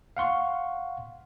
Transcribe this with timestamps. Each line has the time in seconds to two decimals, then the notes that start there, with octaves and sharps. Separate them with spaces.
0.17 F5 F#5 C6 C#6